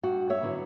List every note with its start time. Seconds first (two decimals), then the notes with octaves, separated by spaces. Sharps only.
0.03 G2 F#4
0.30 C#5 E5
0.42 D3 F#3 B3 E4